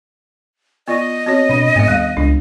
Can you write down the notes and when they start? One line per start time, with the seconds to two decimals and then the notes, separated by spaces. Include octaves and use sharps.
0.88 B3 F4 D5 D#5
1.26 C4 F#4 C#5
1.49 B2 D4 B5
1.76 G#2 B3 E5
1.88 D#2 G3 F5
2.17 C#2 D4